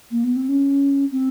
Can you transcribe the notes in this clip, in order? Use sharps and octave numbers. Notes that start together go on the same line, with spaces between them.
A#3
B3
C4
C#4
C4